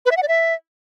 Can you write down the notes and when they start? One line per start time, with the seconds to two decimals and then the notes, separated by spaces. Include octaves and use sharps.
0.06 B4
0.11 E5
0.17 F#5
0.23 D5
0.28 E5